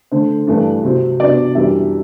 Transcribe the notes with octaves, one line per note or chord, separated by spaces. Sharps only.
D3 A3 D4 C5
G2 E3 A3 D4
C3 F#3 C4
C3 F#3 B3 D4 D5
F#2 E3 G3 D4 E5